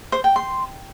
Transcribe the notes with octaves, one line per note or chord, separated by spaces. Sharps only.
C5
G5
C6